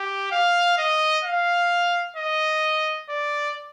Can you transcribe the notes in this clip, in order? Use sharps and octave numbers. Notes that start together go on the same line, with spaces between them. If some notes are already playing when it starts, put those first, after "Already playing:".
Already playing: G4
F5
D#5
F5
D#5
D5